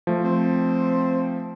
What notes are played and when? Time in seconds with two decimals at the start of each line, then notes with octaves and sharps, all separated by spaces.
0.07 F3 A3
0.24 C4